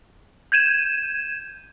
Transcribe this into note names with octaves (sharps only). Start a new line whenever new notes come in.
G6 G#6 D#7 E7